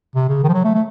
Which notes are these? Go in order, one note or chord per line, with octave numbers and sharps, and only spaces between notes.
C3
C#3
D#3
F3
F#3
A3
A3